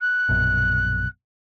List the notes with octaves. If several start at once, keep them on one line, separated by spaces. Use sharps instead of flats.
F#6
A#1 F#2 B2